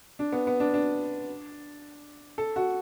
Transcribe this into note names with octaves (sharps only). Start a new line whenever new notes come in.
D4
B3
B3
D4
D4
A4
F#4